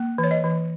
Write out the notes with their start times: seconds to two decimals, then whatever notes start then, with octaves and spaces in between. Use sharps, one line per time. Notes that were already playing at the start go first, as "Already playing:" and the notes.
Already playing: A#3
0.18 E3
0.24 C#5
0.31 D#5
0.44 E3